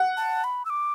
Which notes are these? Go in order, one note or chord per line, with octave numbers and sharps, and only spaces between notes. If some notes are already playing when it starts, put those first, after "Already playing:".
Already playing: F#5
A5
B5
E6
D6